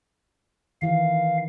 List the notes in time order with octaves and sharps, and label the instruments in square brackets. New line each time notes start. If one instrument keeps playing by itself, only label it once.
[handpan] D#3 E3 [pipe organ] F5